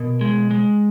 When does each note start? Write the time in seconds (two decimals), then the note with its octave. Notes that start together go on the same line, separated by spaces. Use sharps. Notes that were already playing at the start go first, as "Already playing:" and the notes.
Already playing: B2 A#4
0.21 G#3
0.51 G#3